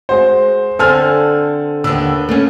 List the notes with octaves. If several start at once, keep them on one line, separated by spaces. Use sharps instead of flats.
G#3 F#4 C5
D3 C4 A4 C5 G#5 F6
D#2 D3 B3 B4 E6
A3 A#3 C#4